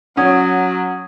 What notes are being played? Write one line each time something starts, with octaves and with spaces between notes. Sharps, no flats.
F#3 C#4 F#5 D#6 G#6